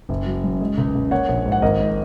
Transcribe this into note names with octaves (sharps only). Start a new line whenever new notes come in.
F#1
F#3
F#2
G#3
C#2
C#3
A#3 C#5 F#5
A#1
G#2
F#5
G#1 A#4 D#5
G#2